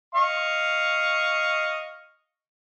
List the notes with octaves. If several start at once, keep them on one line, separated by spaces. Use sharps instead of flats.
D#5 F5 C#6